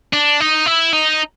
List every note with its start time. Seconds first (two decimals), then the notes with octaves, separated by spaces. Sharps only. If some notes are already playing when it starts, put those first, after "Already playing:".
0.13 D4
0.40 D#4
0.66 E4
0.93 D#4